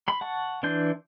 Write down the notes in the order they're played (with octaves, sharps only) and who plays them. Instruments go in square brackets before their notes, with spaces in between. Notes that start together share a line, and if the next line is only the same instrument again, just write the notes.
[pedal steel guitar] B5 C6
F#5 A5 C#6
E3 D4 C6 G6